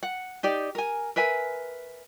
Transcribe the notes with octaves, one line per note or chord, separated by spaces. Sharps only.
F#5
D#4 G4 D5
A#4 G#5
A#4 B4 E5 G#5